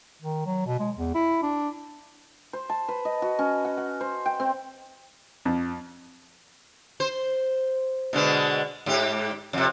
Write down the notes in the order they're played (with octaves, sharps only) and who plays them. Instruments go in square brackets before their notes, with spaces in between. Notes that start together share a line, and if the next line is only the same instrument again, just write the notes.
[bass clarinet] D#3
F#3
B2
G#3
E2
E4
D4
[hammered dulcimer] C5
A5
B4
D#5
F#4
C#4
F#5
F#5
C5
G5
C4
[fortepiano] F2
[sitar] C5
B2 D3 G#3
G#2 G4
F2 C3